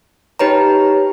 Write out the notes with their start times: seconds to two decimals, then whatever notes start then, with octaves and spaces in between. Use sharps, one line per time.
0.39 D#4 G4 B4 C#5 A#5